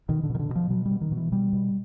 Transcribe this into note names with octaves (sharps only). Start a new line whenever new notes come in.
B2 D#3
D3
B2
D#3
D3
B2
F3
B2 F#3
G3
B2
D#3
B2
E3
B2 G3
B2